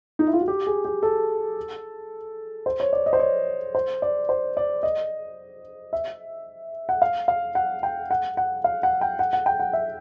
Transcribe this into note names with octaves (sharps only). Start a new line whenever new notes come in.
D#4
E4
F4
F#4
G4
G#4
G4
A4
C5
C#5
D5
D#5
C5
C#5
C5
D5
C5
D5
D#5
E5
F#5
F5
F5
F#5
G5
F#5
F#5
F5
F#5
G5
F#5
F#5
G5
F#5
E5